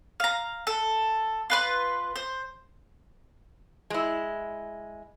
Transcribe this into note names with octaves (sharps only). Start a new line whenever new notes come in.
F5 A#5
A4
F4 B4 C6
C5
G#3 E4